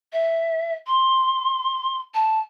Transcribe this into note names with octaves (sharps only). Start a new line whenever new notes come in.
E5
C6
A5